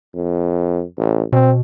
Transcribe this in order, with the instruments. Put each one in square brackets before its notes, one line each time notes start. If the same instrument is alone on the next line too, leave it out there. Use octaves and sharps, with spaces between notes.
[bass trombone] F2
A1
[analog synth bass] B2 [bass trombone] C4